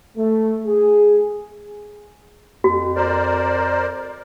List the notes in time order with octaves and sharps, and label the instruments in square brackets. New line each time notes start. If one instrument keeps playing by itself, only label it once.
[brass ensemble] A3
G#4
[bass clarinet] F2 [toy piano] F#4
[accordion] A#4 C5 D5